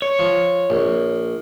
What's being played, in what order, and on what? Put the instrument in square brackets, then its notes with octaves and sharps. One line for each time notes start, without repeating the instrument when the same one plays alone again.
[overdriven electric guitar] C#5
[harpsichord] F3
A#1